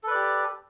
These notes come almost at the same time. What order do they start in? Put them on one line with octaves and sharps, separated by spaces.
A4 B4 D5 G4